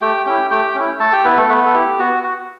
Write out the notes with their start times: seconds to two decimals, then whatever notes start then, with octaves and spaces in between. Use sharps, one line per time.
0.01 A3 G4 G5
0.26 C#4 E4 G4 G5
0.50 A3 G4 G5
0.75 C#4 E4
1.00 A3 A4 A5
1.12 G4 G5
1.25 B3 E4 B4
1.37 A3 A4
1.49 A3 B3 B4
1.66 A4
1.74 E4 G4
1.99 B3 F#4
2.23 F#4